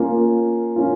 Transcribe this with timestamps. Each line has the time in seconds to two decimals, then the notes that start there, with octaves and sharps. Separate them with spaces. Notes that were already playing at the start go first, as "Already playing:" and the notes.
Already playing: A#3 C#4 F4
0.76 A#3 C#4 F4